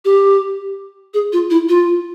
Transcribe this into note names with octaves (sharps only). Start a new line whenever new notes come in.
G4
G#4
F4
E4
F4